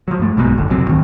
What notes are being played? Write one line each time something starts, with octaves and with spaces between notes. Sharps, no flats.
F3 F#3
G2 A3
B1 G#2 B2
F#1 F2 D3
C2 F#3 C4
D2 G#2 D#3